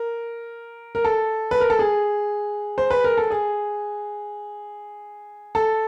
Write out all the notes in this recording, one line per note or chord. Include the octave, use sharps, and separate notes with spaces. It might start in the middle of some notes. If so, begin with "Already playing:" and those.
Already playing: A#4
A#4
A4
B4
A#4
A4
G#4
C5
B4
A#4
A4
G#4
A4